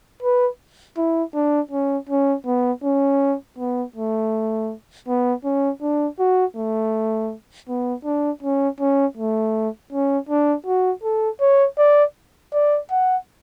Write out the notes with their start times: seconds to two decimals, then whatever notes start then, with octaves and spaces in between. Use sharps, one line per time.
0.23 B4
0.97 E4
1.35 D4
1.72 C#4
2.09 C#4
2.46 B3
2.84 C#4
3.58 B3
3.96 A3
5.08 B3
5.45 C#4
5.82 D4
6.19 F#4
6.57 A3
7.69 B3
8.05 D4
8.43 C#4
8.80 C#4
9.17 A3
9.92 C#4
10.29 D4
10.66 F#4
11.04 A4
11.41 C#5
11.78 D5
12.53 D5
12.91 F#5